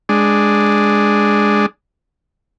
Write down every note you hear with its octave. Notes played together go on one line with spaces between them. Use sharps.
G#3 D4